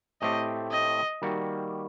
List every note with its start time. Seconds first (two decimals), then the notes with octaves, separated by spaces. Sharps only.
0.22 A2 A3 C4 G4 D#5
0.72 D#5
1.22 D#3 G3 A#3 F#4